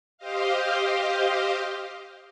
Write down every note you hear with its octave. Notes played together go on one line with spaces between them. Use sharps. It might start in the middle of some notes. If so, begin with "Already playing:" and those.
G4 C5 D#5 F5